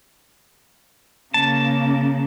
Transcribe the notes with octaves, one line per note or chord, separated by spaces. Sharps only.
C#3 A#3 A5